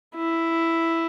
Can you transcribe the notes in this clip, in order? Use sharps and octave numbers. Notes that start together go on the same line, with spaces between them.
E4